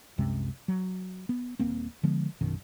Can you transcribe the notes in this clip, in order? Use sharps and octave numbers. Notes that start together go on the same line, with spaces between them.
C2 F#2 C3 G#3
F#3
B3
D#1 A#3 C4
D3 F3 G#3 B3
A#1 F#2 B2 D#3